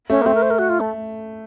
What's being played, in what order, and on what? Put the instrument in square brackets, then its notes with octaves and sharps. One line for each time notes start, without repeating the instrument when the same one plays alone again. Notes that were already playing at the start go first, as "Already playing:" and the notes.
[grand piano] A3 [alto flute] C#4
[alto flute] A#3
[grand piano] A3 [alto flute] C4
[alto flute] A#4
C5
A#4
F#4
F4
A3